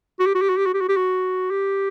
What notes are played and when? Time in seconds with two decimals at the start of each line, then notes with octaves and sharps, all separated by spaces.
0.20 F#4
0.26 G4
0.35 F#4
0.42 G4
0.49 F#4
0.57 G4
0.66 F#4
0.74 G4
0.81 F#4
0.89 G4
0.97 F#4
1.51 G4